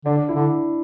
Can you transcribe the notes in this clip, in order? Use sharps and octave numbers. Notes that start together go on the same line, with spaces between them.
D3 D4
D4
E4
D3